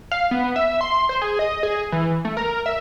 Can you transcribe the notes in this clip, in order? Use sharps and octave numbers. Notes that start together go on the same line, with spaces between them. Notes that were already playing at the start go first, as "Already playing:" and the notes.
F5
B3
E5
C6
C5
G#4
D#5
G#4
E3
A3
A#4
E5